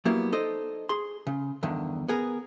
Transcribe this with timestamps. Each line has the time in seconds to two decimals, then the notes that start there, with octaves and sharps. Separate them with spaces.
0.05 F#3 G3 A#3 B3 E4
0.32 D#4 A4 C5 D5 D#5
0.89 G#4 C6
1.27 C#3
1.63 E2 G2 D3 D#3
2.08 B3 G#4 A#4